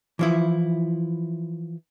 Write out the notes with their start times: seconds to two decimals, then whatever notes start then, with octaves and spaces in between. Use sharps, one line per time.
0.19 E3 F3 E4